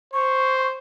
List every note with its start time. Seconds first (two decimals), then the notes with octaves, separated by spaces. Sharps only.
0.13 C5 C#6